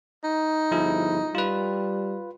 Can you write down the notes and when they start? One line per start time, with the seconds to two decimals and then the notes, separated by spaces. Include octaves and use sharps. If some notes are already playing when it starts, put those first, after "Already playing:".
0.24 D#4
0.71 G1 F3 E4 G#4
1.35 G3 F4 B4